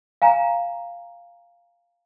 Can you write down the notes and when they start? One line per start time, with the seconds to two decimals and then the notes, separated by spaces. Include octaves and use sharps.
0.22 F5 G#5 A#5